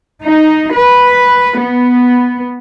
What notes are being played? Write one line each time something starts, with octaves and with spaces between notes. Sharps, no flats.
D#4
B4
B3